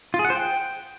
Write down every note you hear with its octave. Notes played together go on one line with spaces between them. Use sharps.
F4
G#4
F#5
C5
G5